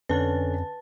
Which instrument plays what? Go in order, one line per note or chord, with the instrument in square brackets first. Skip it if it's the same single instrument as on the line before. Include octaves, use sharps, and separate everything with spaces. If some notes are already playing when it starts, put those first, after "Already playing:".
[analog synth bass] F2 [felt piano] D3 C#4 [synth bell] B4 A5 A6